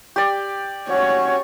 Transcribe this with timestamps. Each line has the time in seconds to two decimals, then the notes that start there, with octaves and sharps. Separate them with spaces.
0.16 G4 D5
0.89 C#4 F#4 C#5